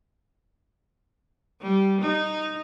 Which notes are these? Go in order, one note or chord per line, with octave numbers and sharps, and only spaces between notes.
G3
D#4